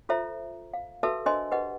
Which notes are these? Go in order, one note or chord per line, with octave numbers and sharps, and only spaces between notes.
F4 A4 C5 E5 A#5
F5
F#4 A4 B4 E5 A5 E6
D4 A#4 C5 D#5 G#5 C6
G4 B4 D#5 F#5